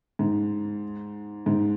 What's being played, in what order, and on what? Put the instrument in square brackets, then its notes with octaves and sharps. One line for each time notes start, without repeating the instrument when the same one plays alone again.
[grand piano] G#2
G#2